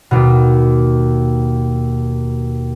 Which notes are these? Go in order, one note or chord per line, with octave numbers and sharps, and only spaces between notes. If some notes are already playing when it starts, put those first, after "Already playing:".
D#2 B2